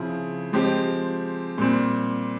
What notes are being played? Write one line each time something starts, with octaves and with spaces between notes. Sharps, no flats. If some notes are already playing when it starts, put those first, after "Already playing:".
Already playing: C#3 F3 C4 E4 G#4
F3 G#3 C4 G4 C5
A#2 G3 C4